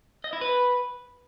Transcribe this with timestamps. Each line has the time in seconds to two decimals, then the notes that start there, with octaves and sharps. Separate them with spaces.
0.24 D#5
0.33 E4
0.41 B4